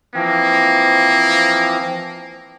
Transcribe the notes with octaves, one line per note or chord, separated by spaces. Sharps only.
E3 F3 A#3 C4